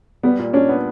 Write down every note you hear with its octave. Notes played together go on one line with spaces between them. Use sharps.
G3 B3
A#2
C#4 D4
B3